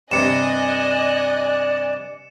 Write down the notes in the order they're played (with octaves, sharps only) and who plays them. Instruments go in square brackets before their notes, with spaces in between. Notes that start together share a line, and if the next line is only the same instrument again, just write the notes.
[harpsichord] G2 C3 [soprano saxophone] D5 [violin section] D#5 G#5 F#6 [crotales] C#7 E7